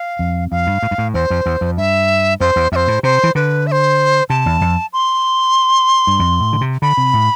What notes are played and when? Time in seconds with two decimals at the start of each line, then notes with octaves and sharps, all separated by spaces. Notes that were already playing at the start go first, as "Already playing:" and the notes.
Already playing: F5
0.19 F2
0.51 F2 F5
0.67 G2
0.83 A2
0.91 G2
0.98 A2
1.14 E2 C5
1.30 F2
1.46 E2
1.61 F2
1.77 G2 E5
2.40 F2 C5
2.56 E2
2.72 F2 E5
2.76 C5
2.88 A2
3.03 C3 C5
3.24 E3
3.35 D3 B4
3.67 E5
3.72 C5
4.30 C3 A5
4.46 E2
4.61 F2
4.93 C6
6.07 G2
6.19 F2
6.40 A2
6.53 D3
6.61 C3
6.82 D3 B5
6.97 C3
7.13 A2